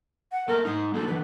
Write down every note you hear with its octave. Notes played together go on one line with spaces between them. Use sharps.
F#5
A3 A#3 A4 A#4
G#3 D#4 D#6
A#3 D#4 F#4 A4
D3 E3 B4